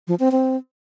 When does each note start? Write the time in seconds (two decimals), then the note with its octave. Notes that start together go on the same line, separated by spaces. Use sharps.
0.08 F3
0.20 C4
0.31 C4